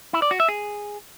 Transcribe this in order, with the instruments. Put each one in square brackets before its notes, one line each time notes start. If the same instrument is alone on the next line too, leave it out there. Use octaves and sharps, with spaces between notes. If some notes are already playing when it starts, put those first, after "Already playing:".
[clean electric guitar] E4
D5
F#4
E5
G#4